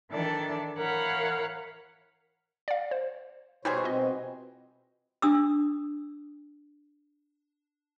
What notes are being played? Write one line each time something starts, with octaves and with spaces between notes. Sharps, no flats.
D#3 E3 D4 A4 D5
E3 A#4 C#5 F5 F#5 B5
D5 F5
C5
B2 E3 G3 D#4 G#4 C5 C#5
B2 C4 F4 D#5
D4 D#6 E6